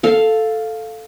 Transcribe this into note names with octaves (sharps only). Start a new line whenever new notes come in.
A4 F5